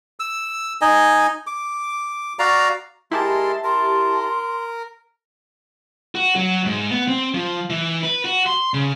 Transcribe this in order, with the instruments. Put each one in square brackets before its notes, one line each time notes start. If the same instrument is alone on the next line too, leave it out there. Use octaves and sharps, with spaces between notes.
[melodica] E6
D#4 D#5 G#5
D6
F#4 D5 F5 A#5
[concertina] G#3 A#4 C6 [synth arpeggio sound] E4 G4 A5
[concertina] A#4 [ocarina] C6
[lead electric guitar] F#4
F#3
G#2
B3
C4
F3
E3
B4
F#4
C6
C#3